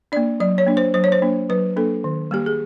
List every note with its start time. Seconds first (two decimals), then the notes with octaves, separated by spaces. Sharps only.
0.12 A#3 D4 D5
0.40 F#3 D5
0.58 C#5
0.67 A#3 D4
0.77 C5
0.94 F#3 C5
1.04 C#5
1.12 C5
1.22 A#3 D4
1.50 F#3 B4
1.77 A#3 D4 A4
2.04 D#3
2.31 G3 A#3 G4
2.46 G#4